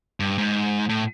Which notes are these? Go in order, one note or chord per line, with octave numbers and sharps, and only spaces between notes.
G2
G#2
A2